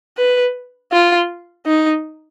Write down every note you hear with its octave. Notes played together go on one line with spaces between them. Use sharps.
B4
F4
D#4